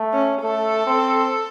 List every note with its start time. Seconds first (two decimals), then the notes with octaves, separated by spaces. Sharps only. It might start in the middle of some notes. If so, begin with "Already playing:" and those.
Already playing: A3
0.13 C#4
0.42 A3 A4
0.87 C4